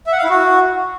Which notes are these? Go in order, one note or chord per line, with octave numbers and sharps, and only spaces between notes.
E5
F#5
F5
E4
F#4